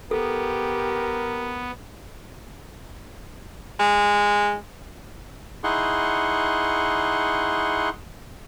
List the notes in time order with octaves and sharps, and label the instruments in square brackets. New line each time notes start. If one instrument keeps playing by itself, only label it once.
[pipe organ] B3 [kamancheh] G4 [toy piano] A4 [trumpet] A#4
[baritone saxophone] G#3
[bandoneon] D#4 E4 G#4 F#5 C6 C#6